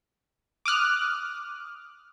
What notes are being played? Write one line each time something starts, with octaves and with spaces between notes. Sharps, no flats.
D6 D#6 F6 F#6